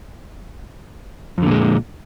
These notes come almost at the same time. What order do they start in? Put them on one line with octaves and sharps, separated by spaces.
F2 D3 A#2 G#3